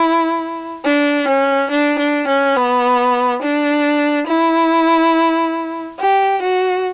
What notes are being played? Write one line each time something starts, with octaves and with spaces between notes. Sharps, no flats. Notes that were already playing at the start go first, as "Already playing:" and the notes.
Already playing: E4
D4
C#4
D4
D4
C#4
B3
D4
E4
G4
F#4